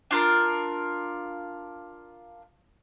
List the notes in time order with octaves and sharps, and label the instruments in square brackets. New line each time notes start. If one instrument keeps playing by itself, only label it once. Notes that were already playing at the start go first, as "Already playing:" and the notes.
[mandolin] D4 F4 A#4